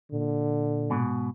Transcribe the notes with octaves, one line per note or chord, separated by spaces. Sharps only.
A#2 D3
G#2 B2